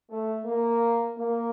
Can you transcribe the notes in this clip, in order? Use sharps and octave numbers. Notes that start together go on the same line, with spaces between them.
A3
A#3
A#3